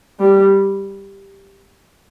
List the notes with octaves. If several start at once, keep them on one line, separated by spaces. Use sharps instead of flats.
G3